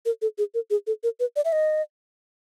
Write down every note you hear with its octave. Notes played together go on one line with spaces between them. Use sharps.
A#4
A4
G#4
A#4
G#4
A4
A#4
B4
D5
E5
D#5